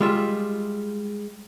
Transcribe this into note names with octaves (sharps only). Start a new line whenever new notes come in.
G3 G#3 F4 E5